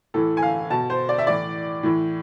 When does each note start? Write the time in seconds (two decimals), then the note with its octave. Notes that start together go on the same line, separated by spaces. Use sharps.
0.14 A2 E3 A4
0.37 G#5
0.42 F5
0.70 B2 A5
0.90 C5
1.09 D5
1.18 E5
1.27 A2 E3 D5
1.83 A2 E3